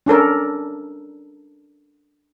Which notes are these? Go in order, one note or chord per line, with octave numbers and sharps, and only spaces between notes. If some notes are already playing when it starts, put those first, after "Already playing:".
C#4 D4 A4 A#4